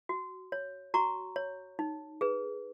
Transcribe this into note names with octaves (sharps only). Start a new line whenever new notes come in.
F#4
C#5
F#4 A#5 C#6
C#5
D#4
G#4 B4